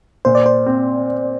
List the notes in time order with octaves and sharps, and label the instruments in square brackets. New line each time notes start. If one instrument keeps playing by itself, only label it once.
[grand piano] A#2 [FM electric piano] C5
[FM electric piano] D5
C5
[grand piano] C4